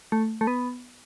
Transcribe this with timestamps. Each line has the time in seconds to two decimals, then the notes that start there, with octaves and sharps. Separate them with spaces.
0.12 A3
0.41 A3
0.47 B3